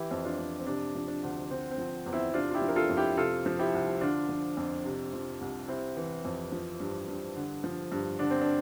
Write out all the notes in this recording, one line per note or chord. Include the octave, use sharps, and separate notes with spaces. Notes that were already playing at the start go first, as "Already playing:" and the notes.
Already playing: E3 E4 G4
F2
D4 F4
F2
C4
C3 D4
F3
D4
D2
D3 C4
C4
F3
E2
C4 E4
C3 D4 F4
F4
E4 G4
F3
A#4
F4 A4
F2
E4 G4
C3 F4 A4
F3
E4 G4
C2
D3 D4 F4
F3
F2
C3
F3
C2
C3 C4 E4
E3
F2
F3
G2
G2
D3
F3
G2
D3 D4
C4
D4